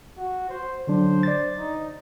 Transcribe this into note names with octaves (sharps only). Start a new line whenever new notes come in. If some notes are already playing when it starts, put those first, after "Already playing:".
F#4
C5
D3 F#3 D4 C5
D5 A6
D#4